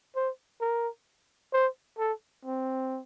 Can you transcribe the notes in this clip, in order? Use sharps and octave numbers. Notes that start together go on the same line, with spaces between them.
C5
A#4
C5
A4
C4